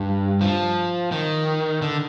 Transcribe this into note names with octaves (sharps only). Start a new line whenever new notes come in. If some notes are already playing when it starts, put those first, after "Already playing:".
Already playing: G2
F3
D#3
D3